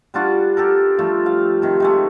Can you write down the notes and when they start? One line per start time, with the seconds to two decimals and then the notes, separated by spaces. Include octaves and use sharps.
0.14 G3 D4 F4 F#4
0.57 G4 A4 A#4
0.99 F3 G3 A3
1.26 F5
1.62 C3 D#3
1.80 D#3 G#3 A3